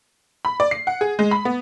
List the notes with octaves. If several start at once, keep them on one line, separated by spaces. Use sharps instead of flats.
B5
D5
C7
F#5
G#4
G#3
B5
B3